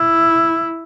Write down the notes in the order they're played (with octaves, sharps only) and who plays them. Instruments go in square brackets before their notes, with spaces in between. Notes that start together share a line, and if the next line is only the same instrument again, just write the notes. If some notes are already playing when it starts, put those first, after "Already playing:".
Already playing: [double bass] E4